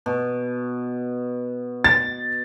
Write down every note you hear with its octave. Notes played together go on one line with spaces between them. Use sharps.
B2
A6